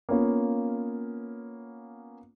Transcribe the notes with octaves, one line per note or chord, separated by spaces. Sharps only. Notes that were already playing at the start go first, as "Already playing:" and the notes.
A#3 B3 C#4 F4